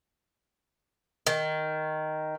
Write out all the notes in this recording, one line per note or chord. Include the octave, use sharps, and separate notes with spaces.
D#3